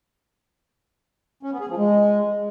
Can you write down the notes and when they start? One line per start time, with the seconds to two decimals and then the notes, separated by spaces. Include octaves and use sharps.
1.43 C#4
1.52 B3
1.60 G#4
1.69 F3
1.77 G#3